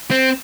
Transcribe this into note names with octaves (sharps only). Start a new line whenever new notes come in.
C4